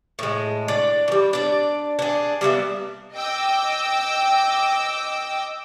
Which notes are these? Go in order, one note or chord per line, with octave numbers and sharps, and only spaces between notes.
A2 G#3
D4 D5
E3 G3
D4 D5
D4 G#4
G3 A#3 B3 E5
D#5 G5 D6 E6